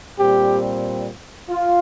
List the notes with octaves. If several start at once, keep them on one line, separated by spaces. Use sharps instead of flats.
A#2 G3 C4 G4
F4